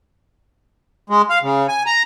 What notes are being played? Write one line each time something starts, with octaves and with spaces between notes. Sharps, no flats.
G#3
F5
C#3
G#5
A#5